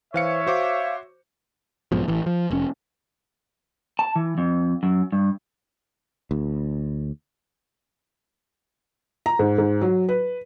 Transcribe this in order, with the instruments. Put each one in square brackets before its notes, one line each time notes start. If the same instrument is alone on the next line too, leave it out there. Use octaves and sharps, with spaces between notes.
[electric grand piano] E3 F5 C#7 [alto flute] C5 [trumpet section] C#5 E5
[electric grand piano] F#4 C5 D6 [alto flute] F5
[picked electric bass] B1 G#2 B2 F3
A1 E3
F3
F1 C#4
[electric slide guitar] A5
E3
F2
F#2
G2
[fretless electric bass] D2
[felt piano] A#5
G#2
G#2
F#3
B4